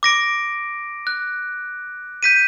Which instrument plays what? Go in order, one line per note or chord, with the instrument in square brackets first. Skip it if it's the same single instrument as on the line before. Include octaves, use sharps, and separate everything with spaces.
[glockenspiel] D6 A#6 D7
F#6
G6 B6 D#7